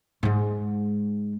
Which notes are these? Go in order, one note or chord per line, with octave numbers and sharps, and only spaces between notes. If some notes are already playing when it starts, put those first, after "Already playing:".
G#2 G#3